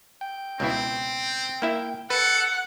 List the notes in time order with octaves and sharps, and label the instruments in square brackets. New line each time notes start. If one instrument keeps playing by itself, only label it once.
[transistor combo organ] G5
[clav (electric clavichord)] C#2 B2 E4 [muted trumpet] C4
[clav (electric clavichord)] A#3 E4 E5
[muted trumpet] A4 [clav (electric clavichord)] B4 [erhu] F#5